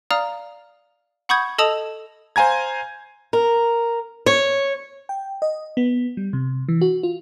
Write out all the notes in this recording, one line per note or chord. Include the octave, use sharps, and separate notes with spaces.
D5 F5 A#5 D#6 F6
F#5 B5 C#6 D#6 G6 G#6
A4 D#5 A5 D#6 E6 F7
C5 F5 G#5 A#5 G#6
A#4
C#5
G5
D#5
B3
G3
C3
E3
F#4
F4